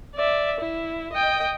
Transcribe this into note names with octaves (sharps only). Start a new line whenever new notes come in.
D5 E5
E4
D#5 G5